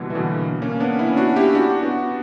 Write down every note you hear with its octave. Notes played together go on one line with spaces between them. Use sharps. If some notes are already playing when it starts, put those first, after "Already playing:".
Already playing: B2 D3 E3 F#3 G3 A#3
E3
B2 D3
A#3 C#4
B3 D4
C#4 E4
D4 F#4
E4 G4
D4 F#4
B3 D4